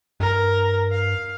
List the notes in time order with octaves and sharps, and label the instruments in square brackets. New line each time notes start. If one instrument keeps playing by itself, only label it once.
[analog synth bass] G2 [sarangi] A#4
[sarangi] F5